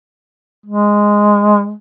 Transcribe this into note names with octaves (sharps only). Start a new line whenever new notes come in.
G#3